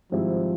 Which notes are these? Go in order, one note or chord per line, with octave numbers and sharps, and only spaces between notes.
G#2 D#3 F3 G3 C4 E4